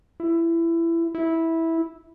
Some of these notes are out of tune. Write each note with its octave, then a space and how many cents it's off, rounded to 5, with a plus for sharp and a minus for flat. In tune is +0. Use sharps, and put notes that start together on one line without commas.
E4 +20
E4 -10